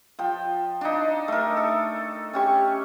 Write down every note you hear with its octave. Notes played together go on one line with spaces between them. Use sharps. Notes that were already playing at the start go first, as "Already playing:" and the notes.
F3 G5
D4 D#4
A3 A#4
A4
C#4 G4 C#6